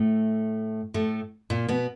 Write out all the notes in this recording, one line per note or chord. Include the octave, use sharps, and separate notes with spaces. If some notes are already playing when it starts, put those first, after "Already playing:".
Already playing: A2 A3
A2 A3
A#2 A#3
B2 B3